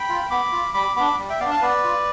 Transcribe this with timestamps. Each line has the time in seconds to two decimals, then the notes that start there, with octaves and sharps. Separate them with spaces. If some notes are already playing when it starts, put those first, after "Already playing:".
Already playing: G5 B5
0.09 F4
0.31 B3 B5 D6
0.52 F4
0.74 G3 B5 D6
0.96 B3 D4 B5 D6
1.19 G3
1.29 E5 G5
1.40 B3 D4 D5 F5
1.51 F5 A5
1.62 B3 B4 D5
1.84 F4